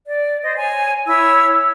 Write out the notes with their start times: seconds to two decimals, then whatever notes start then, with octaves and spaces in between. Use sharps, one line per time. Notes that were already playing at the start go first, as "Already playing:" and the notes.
0.07 D5
0.43 C5 D#5
0.56 C#5 G#5
1.07 E4 C#5 E6